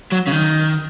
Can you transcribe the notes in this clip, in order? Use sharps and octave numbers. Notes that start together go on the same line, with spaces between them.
F#3
C#3
D#3